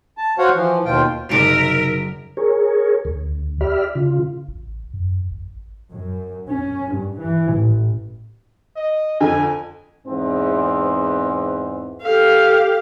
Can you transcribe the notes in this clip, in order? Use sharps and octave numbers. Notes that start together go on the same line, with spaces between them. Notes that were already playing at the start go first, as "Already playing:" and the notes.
A5
F#4 C5 C#5 F5 F#5
E3 F3
D#2 B2 F4 G5
F#1 C3 D#4 A#4 E5 D7
G#4 A#4 C#5
D2
G4 D5 E5 B5 F6
C#3 F4
A1
F#2
A1
F#2
C#4
G2
E3
A1
D#5
F2 D3 G#5
E2 G#2 C4
G4 A4 F5